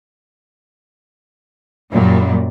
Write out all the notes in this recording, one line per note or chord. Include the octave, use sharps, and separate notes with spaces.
F#2 A#2 F#3 G3